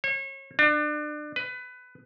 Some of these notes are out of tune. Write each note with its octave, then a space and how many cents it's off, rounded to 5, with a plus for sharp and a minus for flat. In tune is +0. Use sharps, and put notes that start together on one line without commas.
C#5 -35
D4 +30
B4 +20